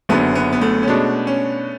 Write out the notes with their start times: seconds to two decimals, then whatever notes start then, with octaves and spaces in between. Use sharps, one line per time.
0.09 F#1 F#2 D3 B3
0.35 B3
0.52 B3
0.61 A3
0.83 C#4
0.87 B2 G#3 B3 D4
1.27 C#4